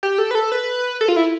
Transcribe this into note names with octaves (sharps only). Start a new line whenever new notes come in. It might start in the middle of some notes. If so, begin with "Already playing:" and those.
G4
A4
B4
A4
B4
A4
F4
E4